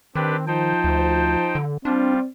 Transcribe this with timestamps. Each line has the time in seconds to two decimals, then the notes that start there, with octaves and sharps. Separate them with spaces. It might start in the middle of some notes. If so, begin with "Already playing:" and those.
0.15 D#3 C4 D4 G4 B4
0.47 F3 D#4 C5 G5 A5
0.84 D2
1.55 D3
1.85 G3 C4 D4 F4